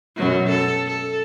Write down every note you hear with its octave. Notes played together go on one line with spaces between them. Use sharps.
F#2 B2 F#3
A4
A4